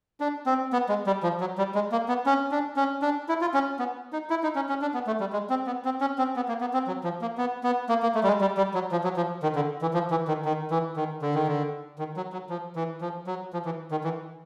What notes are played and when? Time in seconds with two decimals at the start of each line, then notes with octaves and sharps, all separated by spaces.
0.20 D4
0.46 C4
0.73 B3
0.89 G#3
1.07 G3
1.23 F3
1.40 F#3
1.58 G3
1.75 G#3
1.92 A#3
2.08 B3
2.26 C#4
2.51 D4
2.76 C#4
3.02 D4
3.29 E4
3.41 F4
3.54 C#4
3.79 B3
4.13 D#4
4.30 E4
4.43 D#4
4.56 C#4
4.69 C#4
4.82 D4
4.94 B3
5.07 A3
5.20 G3
5.33 G#3
5.50 C4
5.67 B3
5.85 C4
6.01 C#4
6.18 C4
6.36 B3
6.48 A#3
6.61 B3
6.74 C4
6.87 F#3
7.04 F3
7.22 A#3
7.38 B3
7.64 B3
7.89 A#3
8.03 A#3
8.15 A3
8.24 G3
8.27 G#3
8.41 G3
8.57 G3
8.74 F#3
8.92 F3
9.04 F#3
9.17 F3
9.43 D#3
9.56 D3
9.82 E3
9.94 F3
10.11 E3
10.28 D#3
10.45 D#3
10.71 E3
10.96 D#3
11.22 D3
11.35 D#3
11.47 D3
11.99 D#3
12.17 F#3
12.33 F#3
12.50 F3
12.76 E3
13.01 F3
13.27 F#3
13.53 F3
13.65 E3
13.91 D#3
14.04 E3